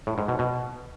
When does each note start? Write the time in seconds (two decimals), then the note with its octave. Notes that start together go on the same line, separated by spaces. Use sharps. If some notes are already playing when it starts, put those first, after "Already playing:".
0.07 A2
0.18 G#2
0.28 B2
0.39 B2